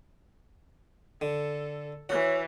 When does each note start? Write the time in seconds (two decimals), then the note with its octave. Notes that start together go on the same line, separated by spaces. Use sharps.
1.21 D3 A4
2.09 E3 F#4 C#5